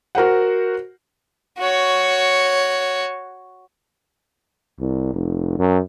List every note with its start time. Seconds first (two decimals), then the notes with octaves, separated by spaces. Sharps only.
0.15 F#4 A#4 C5 F#5
1.59 F#4 C#5
4.80 C2
5.14 F1
5.59 F#2